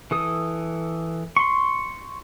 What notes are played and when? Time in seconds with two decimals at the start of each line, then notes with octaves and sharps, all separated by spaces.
0.11 E3 A4 D#6
1.36 C6 C#6